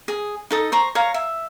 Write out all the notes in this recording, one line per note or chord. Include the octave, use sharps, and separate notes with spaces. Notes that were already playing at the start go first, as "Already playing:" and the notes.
G#4
D#4 A4 D#6
C5 A#5 C#6
C#5 F5 A#5
E5